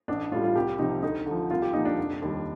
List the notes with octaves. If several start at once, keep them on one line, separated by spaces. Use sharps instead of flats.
A1 D4
A2 G3 F4
F4
C2 G4
C3 F3 D#4
D2 D#4
D3 F3
C2 F4
G4
A#2 F3 D#4
D4
F1
D#2 D#3 G3